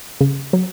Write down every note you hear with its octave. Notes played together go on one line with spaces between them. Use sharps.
C#3
F#3